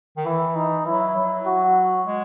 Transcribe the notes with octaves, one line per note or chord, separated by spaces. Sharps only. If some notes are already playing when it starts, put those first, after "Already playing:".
D#3
E3 E4
D#4
F#3 E4
F#3
F#4
G#3